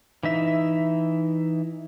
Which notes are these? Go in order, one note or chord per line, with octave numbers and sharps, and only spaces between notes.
E3 D#4 E5